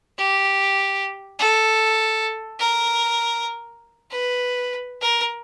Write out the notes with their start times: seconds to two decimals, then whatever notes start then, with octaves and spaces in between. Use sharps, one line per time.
0.18 G4
1.39 A4
2.60 A#4
4.11 B4
5.01 A#4